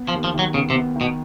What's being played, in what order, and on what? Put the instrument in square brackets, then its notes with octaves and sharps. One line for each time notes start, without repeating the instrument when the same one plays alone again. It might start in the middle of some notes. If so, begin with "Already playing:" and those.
Already playing: [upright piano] B3
[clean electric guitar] F3
[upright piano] D#2
[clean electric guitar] F3
[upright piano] D#3 [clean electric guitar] F#3
[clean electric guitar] C#3 [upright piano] B3
[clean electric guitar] C3
[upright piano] B3
D#3
[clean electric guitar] B2